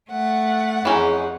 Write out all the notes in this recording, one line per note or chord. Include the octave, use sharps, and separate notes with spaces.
A3 F#5
F2 E3 C#4 D#4 G#4